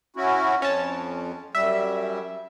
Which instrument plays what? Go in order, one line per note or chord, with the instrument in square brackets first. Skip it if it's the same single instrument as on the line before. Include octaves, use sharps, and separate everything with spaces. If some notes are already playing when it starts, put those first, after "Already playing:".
[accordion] C#4 E4 F#4
[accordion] F2 [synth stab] C#4 A5
[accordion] F#2 G3 [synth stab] E5